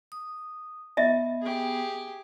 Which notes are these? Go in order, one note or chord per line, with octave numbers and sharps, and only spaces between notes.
D#6
B3 D#5 E5
G4 G#4